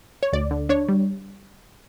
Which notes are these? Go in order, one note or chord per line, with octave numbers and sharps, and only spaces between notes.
C#5
D2 D5
D3
D4 C#5
G3